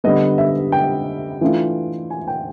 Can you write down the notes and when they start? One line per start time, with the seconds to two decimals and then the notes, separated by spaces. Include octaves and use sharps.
0.04 D3 G3 B3 D#5
0.38 E5
0.72 G5
1.41 E3 A3 D4 F4
2.10 G#5
2.28 G5